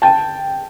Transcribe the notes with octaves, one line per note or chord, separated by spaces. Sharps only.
G5 A5